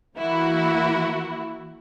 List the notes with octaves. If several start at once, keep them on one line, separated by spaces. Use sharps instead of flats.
E3 A#3 E4 F#4